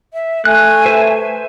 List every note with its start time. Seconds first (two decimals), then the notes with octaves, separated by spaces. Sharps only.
0.14 E5
0.45 A3 G#5 F#6
0.86 B4 C5 E5